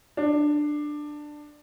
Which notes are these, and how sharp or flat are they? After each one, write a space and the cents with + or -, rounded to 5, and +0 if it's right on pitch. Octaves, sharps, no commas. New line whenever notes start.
D4 +15